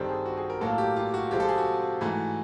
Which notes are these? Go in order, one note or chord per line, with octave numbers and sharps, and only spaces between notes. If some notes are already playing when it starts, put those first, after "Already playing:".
Already playing: G2 D#3 G3 C4 A4
G#4
F#4
G#4
A#4
A2 F#3 A#3 A4
G4
F4
F#4
C3 F3 G#3 C4 G4
A4
G#4
F#4
G#2 E3 A3